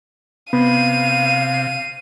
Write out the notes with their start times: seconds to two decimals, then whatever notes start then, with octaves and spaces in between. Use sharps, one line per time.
0.53 C3 B3 F5 D#7
1.54 C7